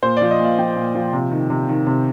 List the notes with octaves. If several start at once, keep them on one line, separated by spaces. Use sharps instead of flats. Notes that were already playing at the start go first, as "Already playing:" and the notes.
A#2 C5
D5
F3
D#5
A#2 F5
F3 G5
A#2
F3
C3
D#3
C3
D#3
C3